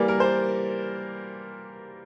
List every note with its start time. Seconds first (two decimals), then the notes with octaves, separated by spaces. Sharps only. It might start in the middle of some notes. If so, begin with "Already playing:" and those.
Already playing: E3 G3 A#3 D5
0.08 A#4
0.20 C5